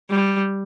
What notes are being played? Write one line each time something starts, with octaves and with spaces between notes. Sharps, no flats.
G3